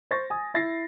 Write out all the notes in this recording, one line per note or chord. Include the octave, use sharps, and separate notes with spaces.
C5 C#6 A6 A#6
G#5 D#6
E4 A6 A#6 C7